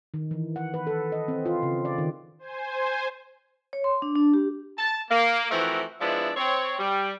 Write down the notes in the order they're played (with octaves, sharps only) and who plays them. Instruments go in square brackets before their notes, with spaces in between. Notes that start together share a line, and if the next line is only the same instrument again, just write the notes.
[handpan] D#3
E3
F#5
B4
A4
D#5
C4
F4
C#3
D5
D#3
[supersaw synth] C5 G#5
[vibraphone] C#5
C6
D4
D4
G4
[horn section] A5
A#3
E3 F3 A3 C4 F#4 A#4
F3 G#3 B3 D4 E4 E5
C4 C#5
G3